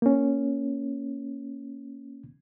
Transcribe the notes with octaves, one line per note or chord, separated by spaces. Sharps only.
A#3 C#4